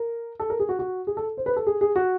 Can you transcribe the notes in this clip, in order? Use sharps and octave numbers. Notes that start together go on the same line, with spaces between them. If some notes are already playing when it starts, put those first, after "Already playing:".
Already playing: A#4
A4
A#4
G#4
F#4
F#4
G#4
A4
C5
B4
A4
G#4
G#4
F#4